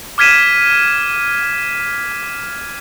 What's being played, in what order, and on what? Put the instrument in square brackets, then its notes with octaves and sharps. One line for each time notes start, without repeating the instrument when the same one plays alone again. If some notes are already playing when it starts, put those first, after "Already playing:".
[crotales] D6 F6 G#6 B6 D#7 E7